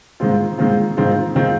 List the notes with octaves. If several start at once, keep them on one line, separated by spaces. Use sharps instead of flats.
G#2 D#3 G#3 C4 F4
G#2 D#3 G#3 C4 F4
G#2 D#3 G#3 C4 F4
D#3 G#3 C4 F4